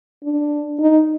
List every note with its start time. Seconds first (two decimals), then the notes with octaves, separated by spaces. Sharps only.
0.24 D4
0.79 D#4